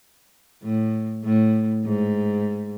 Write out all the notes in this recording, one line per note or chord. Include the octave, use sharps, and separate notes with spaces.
A2
A2
G#2